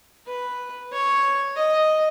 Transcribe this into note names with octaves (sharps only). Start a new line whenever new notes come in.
B4
C#5
D#5